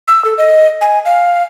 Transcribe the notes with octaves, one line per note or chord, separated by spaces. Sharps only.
E6
A4
D#5
G#5
F5